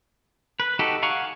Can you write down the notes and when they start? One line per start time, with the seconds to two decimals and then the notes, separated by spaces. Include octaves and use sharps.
0.60 B4
0.79 D#4 F#4 G4 A4 B4
1.03 F5 F#5 G#5 A#5 C#6